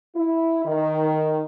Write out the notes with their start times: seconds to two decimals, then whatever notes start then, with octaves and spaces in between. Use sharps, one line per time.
0.15 E4
0.65 D#3